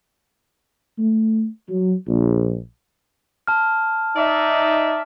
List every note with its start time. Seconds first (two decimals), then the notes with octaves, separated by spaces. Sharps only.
0.98 A3
1.69 F#3
2.07 A#1
3.47 A5 F6
4.16 D#4 D5 E5